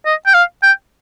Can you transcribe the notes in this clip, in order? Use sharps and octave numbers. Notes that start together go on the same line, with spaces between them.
D#5
G5
F5
G5